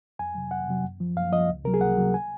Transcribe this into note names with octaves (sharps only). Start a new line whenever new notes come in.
F2 G#5
C3 F#3
F2 F#5
C3 F#3
F#2
F3
F#2 F5
F3 D#5
C#2
C3 F#3 A#4
G#4
C#2 F#5
C3 F#3
G#5